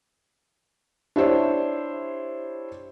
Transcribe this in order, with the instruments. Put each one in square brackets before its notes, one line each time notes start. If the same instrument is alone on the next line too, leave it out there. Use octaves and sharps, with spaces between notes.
[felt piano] D4 E4 G4 C5 C#5 E5